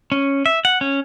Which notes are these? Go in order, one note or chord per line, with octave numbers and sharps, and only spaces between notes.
C#4
E5
F#5
C#4